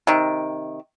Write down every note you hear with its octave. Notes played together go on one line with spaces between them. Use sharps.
C3 D#3